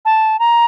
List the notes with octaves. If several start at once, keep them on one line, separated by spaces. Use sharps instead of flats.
A5
A#5